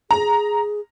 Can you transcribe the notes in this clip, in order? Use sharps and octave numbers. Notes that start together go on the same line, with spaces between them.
G#4 A#5